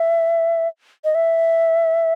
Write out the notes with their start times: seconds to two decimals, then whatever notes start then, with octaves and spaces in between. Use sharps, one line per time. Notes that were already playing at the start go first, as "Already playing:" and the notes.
Already playing: E5
1.04 D#5
1.15 E5